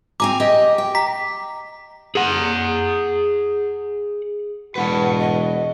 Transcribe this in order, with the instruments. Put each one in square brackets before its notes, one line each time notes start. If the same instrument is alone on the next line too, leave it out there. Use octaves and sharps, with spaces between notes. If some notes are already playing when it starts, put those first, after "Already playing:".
[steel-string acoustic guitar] C4 G#5 A#5 [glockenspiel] D6
[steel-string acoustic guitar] G4 D#5
G5
[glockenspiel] A#5 B6
[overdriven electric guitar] G#4 F#5
[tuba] E1 [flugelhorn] F#4 [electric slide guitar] B4 D5 A5 [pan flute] F#5
[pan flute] D#5